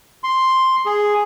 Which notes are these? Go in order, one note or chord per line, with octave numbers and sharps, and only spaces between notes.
C6
G#4